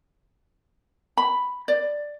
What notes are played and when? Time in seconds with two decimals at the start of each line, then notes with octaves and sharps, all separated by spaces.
1.17 B5
1.68 D5